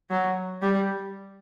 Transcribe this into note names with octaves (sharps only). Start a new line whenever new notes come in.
F#3
G3